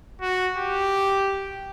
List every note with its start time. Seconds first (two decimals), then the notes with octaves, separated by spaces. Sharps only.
0.22 F#4
0.57 G4